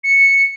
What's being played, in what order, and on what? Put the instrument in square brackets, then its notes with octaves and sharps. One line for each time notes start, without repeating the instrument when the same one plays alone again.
[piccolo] C#7